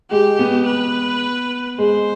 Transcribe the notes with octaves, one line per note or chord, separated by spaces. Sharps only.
G#3 G4
B3
B4
G#3 C5